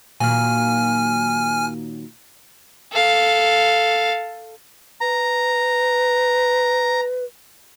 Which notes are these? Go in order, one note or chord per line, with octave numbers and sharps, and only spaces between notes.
A#2 D#3 F#3 G#5 F6
A4 F5
B4 A#5